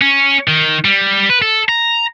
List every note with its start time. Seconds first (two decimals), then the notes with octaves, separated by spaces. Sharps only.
0.01 C#4
0.48 D#3
0.85 G3
1.30 B4
1.42 A4
1.69 A#5